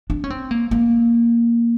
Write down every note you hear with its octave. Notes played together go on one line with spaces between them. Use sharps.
D4
C#4
C4
A#3
A#3